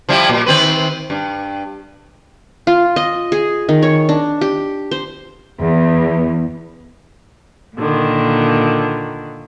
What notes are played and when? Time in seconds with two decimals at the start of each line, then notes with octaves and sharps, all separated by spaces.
0.09 F3 G3 E4
0.29 A#2
0.46 D#3 C4 B4
1.10 G2
2.67 F4
2.96 D#5
3.32 G#4
3.69 D#3
3.82 C#5
4.09 D4
4.41 G4
4.91 C5
5.58 E2
7.76 A#2 D3 D#3